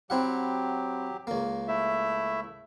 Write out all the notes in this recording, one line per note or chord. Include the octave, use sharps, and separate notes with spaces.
F#3 C4 E4 G4 F#5
C#2 A#3
A3 E4 E5